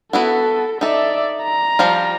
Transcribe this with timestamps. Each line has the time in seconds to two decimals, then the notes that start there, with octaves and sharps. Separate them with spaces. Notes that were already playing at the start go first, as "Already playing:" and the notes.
0.13 B3 E4 F#4 A4
0.81 D#4 A4 D5 E5
1.43 A#5
1.79 F3 G3 F4